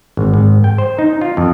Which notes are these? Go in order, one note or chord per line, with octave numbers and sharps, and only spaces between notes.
G#1
G#1
G5
C5
D#4
F4
F2